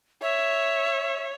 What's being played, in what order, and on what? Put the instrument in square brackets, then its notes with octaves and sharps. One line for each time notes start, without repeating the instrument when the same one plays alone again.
[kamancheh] C#5 [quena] E5